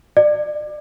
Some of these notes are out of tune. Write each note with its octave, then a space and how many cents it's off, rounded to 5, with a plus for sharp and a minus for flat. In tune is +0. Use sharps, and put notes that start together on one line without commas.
D5 +25